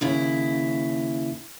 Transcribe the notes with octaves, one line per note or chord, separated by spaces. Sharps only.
D#2 C#3 E4